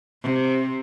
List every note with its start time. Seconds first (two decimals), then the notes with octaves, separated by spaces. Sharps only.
0.23 C3